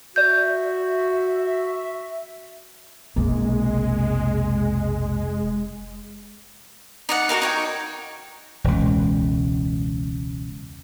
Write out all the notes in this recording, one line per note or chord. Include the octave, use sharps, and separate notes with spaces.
F#4 D5 E5 G6
F1 B1 C3 G#3 A#3
D#4 D5 F#5
F#4 A4 A#4 F5
D#4 C#5 G5
E1 C#2